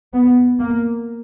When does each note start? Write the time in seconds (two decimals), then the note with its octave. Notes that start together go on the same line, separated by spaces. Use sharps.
0.14 B3
0.60 A#3